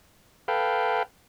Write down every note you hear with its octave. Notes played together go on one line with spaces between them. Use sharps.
A4 B4 F5 G5